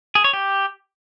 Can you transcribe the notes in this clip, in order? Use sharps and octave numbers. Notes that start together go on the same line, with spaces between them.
G#4
C#5
G4